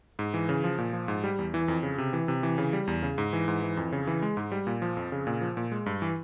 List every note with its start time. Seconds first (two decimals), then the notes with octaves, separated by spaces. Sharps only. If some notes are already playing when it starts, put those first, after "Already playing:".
0.19 G#2
0.34 E3
0.49 C#3
0.64 F3
0.78 A#2
0.93 F3
1.08 G#2
1.24 G3
1.39 E2
1.54 E3
1.68 F2
1.83 C#3
1.98 C3
2.13 E3
2.28 C3
2.43 E3
2.58 C#3
2.73 G3
2.87 E2
3.03 C#3
3.18 G#2
3.33 E3
3.48 G#2
3.62 E3
3.77 F2
3.92 C#3
4.07 E3
4.22 G#3
4.37 G#2
4.52 G3
4.67 A#2
4.82 F3
4.97 F2
5.12 C#3
5.27 A#2
5.41 F3
5.57 A#2
5.72 G#3
5.86 G2
6.02 E3